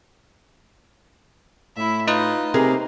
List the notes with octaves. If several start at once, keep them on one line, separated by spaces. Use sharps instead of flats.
A2 E4 E5
D#4 F4 B4 D#5 D#6
C3 A#3 C4 G#4